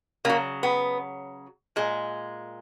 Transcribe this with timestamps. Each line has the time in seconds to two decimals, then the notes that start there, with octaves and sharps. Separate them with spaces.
0.25 C#3 F#3 A#3
0.63 B3
1.76 A#2 G#3